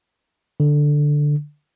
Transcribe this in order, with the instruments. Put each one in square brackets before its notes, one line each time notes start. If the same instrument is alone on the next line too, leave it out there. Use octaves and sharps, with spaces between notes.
[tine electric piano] D3